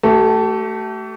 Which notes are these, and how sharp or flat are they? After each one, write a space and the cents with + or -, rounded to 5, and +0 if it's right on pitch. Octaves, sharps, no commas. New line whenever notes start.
A3 +0 G4 -45